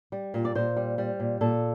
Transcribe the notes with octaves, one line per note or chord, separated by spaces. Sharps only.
G3
A#2
D5
A#2 C5
G3
G3
A#2
A#2 A4